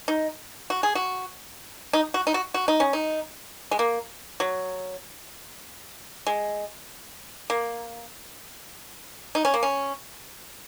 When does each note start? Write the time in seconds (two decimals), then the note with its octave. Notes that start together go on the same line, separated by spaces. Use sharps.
0.08 D#4
0.70 F#4
0.83 G#4
0.95 F#4
1.93 D#4
2.14 F#4
2.27 D#4
2.34 F#4
2.54 F#4
2.68 D#4
2.80 C#4
2.93 D#4
3.71 G#3
3.79 A#3
4.40 F#3
6.27 G#3
7.50 A#3
9.35 D#4
9.45 C#4
9.54 A#3
9.63 C#4